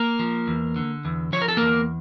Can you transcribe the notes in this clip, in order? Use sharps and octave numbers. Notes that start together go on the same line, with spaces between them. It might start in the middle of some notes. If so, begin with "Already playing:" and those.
Already playing: A#3 A#4
F3
E2
D3
E2
F3 C#5
A#4
A4
E2 A#3 A#4